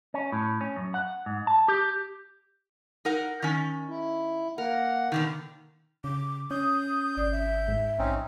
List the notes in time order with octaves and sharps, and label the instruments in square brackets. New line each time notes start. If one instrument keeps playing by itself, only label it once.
[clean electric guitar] C#4
A2
C#4
F#2
F#5
G#2
A5
G4
[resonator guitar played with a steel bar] D#4 A#4 F#5
D#3 C#4
[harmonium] E4
[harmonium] A#3 F#5 [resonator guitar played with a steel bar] A#4
[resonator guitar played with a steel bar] B2 D3 D#3
[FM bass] C#3 [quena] D6
[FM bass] C#4 [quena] D#6 [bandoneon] G6
[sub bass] G#1 [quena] D5
[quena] E5
[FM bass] G#2
[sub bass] A#1 [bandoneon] C4 C#4 D#4